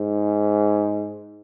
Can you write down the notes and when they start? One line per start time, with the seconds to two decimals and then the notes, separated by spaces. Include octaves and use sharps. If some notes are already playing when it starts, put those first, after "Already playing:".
Already playing: G#2